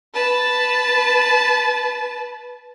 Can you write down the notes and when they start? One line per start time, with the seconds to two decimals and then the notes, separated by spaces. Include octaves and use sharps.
0.14 B4 A5